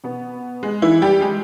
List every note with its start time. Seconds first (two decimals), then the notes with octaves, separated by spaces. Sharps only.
0.04 B2 B3
0.63 G#3
0.82 E3 E4
1.02 G3 G4
1.21 G#3 G#4